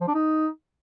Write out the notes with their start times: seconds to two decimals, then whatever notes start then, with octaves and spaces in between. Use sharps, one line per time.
0.01 F3
0.08 D4
0.14 D#4